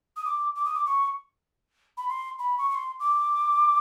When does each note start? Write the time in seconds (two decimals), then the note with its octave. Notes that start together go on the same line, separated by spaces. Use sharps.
0.16 D#6
0.25 D6
0.56 D6
0.65 D#6
0.74 D6
0.86 C#6
1.97 B5
2.09 C6
2.39 B5
2.58 C#6
2.70 C#6
2.75 C6
3.00 D6